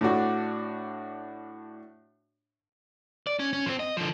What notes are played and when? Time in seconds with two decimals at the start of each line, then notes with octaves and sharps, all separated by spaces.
0.01 A2 D4 F#4
3.27 D5
3.39 C#4
3.53 C#4
3.66 F3 C4
3.79 D#5
3.97 D3 F3